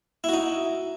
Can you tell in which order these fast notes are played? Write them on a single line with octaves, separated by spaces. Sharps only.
E4 F#4 D#4